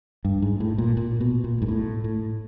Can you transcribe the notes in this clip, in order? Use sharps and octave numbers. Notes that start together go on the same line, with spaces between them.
G2
G#2
A2
A#2
A#2
B2
A#2
G#2
A2
A2